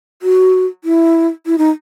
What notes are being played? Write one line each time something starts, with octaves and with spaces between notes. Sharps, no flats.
F#4
E4
E4
D#4